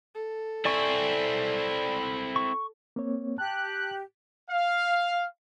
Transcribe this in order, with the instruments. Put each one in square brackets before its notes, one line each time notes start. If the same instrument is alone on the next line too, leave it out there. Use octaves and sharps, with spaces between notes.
[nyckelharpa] A4
[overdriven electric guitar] C4 E4 [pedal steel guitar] D5 G#5 C#6
[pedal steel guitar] C#6
[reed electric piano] A#3 C4 C#5
[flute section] G4 [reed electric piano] A5 [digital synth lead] F#6
[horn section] F5